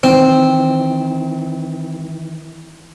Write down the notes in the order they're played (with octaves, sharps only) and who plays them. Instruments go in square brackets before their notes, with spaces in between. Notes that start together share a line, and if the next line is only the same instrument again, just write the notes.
[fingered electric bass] D#3 E3 [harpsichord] C4